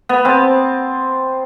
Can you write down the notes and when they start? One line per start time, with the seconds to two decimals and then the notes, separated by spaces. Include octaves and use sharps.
0.09 B3
0.25 C4 A5